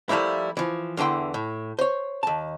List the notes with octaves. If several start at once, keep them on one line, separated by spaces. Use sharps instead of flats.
F3 G3 A3 A#3 E4
E3 F3
E2 D3 E3 G5 C6
A2
C5 C#5
D#2 A5